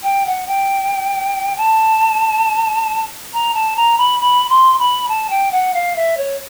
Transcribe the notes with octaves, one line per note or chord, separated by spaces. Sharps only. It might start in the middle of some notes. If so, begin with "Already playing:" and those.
G5
F#5
G5
A5
A#5
A5
A#5
B5
B5
C6
B5
A5
G5
F#5
F5
E5
C#5